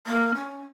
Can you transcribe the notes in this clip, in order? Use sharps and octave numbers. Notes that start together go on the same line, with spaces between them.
A#3
C#4